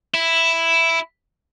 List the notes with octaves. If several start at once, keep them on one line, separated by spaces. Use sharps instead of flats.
E4